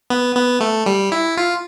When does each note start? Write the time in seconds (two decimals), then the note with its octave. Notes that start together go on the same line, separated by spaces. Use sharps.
0.10 B3
0.35 B3
0.61 A3
0.86 G3
1.12 E4
1.37 F4